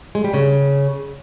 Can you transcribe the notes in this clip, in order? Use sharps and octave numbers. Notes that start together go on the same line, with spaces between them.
G#3
G3
C#3